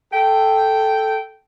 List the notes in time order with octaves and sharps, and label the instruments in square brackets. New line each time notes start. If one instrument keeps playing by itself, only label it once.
[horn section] A4 G5